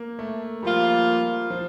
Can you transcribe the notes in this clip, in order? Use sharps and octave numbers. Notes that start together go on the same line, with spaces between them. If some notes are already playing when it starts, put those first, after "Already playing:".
Already playing: A#3
A3
F3 G3 A#3 F4
F3